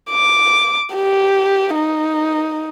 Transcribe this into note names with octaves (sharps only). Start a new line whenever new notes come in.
D6
G4
D#4